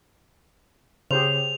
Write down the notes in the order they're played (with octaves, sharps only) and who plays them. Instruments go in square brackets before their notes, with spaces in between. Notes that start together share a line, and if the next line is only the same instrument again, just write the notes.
[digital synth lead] C#3 [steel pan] G4 G#4 C5 [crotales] F7